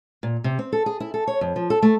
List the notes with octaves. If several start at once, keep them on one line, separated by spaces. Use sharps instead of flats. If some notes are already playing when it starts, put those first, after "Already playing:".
A#2
C3
C4
A4
G#4
E4
A4
C#5
F2
F3
A4
A3